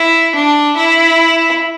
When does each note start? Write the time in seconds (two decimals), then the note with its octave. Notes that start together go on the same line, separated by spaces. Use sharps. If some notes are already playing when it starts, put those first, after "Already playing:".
Already playing: E4
0.35 D4
0.76 E4